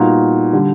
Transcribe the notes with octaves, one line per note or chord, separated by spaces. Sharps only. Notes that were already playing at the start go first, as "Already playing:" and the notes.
Already playing: A#2 G3 B3 D#4 F#4
D3 G3